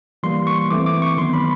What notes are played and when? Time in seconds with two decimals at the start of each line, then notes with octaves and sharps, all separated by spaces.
0.23 E3 G3 A#3 C6
0.47 C#6
0.71 E3 A3 C4 D6
0.86 D6
1.02 C#6
1.17 D#3 F#3 B3 C6
1.33 B5